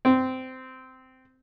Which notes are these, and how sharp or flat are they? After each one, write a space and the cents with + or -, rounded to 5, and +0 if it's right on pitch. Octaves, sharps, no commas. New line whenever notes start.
C4 -15